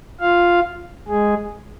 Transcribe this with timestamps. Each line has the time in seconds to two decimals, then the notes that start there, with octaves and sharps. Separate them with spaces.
0.20 F4 F5
1.08 G#3 G#4